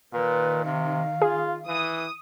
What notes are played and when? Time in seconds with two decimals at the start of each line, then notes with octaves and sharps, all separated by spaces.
0.13 A#2 D#3 B4
0.65 C3 F5
1.22 F4 G#4
1.67 E3 D#6